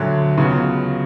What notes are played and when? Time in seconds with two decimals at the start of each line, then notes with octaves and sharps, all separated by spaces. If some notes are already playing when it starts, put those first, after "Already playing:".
Already playing: D2 D3 F#3
0.37 C#2 C#3 F#3 B3